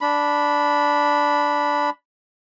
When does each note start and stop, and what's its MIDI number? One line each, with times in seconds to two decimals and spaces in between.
0.01 1.90 62
0.01 1.90 83